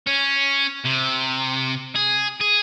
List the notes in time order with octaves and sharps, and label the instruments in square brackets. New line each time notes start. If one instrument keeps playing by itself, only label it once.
[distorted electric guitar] C#4
C3
G#4
G#4